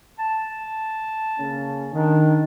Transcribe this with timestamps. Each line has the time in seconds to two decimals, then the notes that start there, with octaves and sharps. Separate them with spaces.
0.19 A5
1.39 C#3 A#3 C#4
1.93 D#3 D4